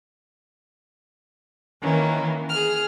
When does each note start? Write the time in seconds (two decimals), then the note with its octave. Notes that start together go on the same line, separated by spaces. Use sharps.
1.82 D#3 E3 A#3 C#4
2.49 G#4 F6